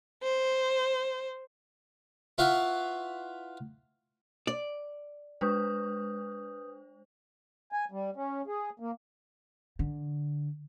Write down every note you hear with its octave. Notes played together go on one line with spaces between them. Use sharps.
C5
E4 F4 B4 F5 F#5 C#6
D5
G#3 D4 B4 C5 D#6 G6
G#5
G3
C#4
G#4
A#3
D3